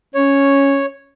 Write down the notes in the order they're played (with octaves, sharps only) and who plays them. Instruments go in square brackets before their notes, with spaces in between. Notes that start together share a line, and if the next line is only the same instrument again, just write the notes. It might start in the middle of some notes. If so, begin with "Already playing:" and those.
[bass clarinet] C#4 [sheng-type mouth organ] C#5